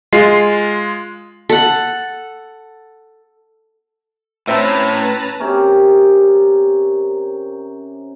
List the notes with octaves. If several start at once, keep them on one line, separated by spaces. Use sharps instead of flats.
G#3 F4 C7
A4 F#5
A2 C4 C#4 B4 C#5 E5 A5 A#5
C3 C#4 A#4